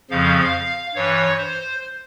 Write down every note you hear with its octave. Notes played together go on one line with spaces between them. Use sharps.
F2 C#3 F3 F5
G2 E3 C#5
C5